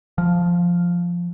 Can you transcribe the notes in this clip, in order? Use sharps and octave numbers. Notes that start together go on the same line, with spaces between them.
F3